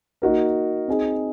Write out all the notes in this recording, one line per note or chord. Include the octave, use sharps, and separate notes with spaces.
A#3 D#4 F#4 A#4
C4 D#4 G#4